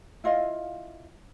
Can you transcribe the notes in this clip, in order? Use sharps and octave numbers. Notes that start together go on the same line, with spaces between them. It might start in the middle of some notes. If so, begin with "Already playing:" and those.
E4 F4 D#5 F5